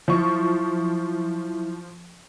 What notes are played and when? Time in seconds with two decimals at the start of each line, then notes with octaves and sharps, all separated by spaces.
0.08 F3 F#3 E4 E5 C#6